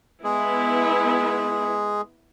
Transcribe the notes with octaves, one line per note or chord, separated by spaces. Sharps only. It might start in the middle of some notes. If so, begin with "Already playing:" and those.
G#3 B3 E4 G#4